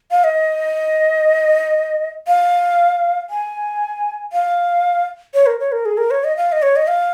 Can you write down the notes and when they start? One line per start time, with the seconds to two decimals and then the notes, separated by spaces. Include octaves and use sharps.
0.11 F5
0.24 D#5
2.27 F5
3.30 G#5
4.33 F5
5.34 C#5
5.46 A#4
5.60 C#5
5.72 A#4
5.86 G#4
5.98 A#4
6.11 C#5
6.24 D#5
6.37 F5
6.52 D#5
6.62 C#5
6.76 D#5
6.88 F5